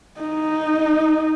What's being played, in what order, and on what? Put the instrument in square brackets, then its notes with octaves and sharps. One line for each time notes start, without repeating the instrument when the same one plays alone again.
[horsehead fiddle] D#4